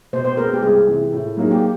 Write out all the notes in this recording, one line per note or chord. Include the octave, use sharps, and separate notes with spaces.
B2 C5
C5
G#3 B3 A#4
G4
C2 G#4
C3 E3
A2
F#3 A#3 D#4 G#4
G4